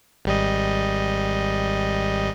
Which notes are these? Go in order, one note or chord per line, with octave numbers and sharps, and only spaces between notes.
G#1 G3 D#5